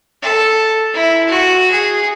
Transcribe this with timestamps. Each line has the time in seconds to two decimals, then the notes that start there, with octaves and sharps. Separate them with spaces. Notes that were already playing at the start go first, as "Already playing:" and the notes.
0.22 A4
0.94 E4
1.28 F#4
1.71 G#4